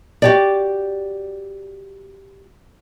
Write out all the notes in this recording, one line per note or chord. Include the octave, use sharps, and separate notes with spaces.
F#4 G4 D5